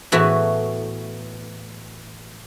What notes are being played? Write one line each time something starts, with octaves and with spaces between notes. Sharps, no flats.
A2 E3 B3 E4 F#4